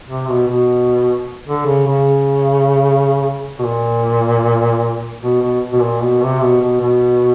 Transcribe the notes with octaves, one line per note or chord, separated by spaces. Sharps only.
C3
B2
B2
D3
C#3
C#3
B2
A#2
B2
B2
B2
A#2
B2
C3
B2
B2
B2